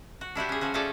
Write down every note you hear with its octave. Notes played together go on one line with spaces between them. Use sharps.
F#4
D4 E4 F#4 G4
C#4 G#4
F3 C#4 F#4
F3 A3 C#4 G#4 A4 D5